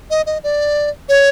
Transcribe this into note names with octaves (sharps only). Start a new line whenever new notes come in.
D#5
D#5
D5
C#5